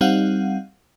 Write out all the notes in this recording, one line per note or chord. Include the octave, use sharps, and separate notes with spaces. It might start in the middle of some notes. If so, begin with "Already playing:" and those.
G3 C4 D#4 F5 F#5